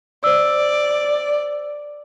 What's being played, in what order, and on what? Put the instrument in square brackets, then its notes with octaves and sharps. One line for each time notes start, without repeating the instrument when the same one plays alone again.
[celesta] C5 E6 [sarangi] D5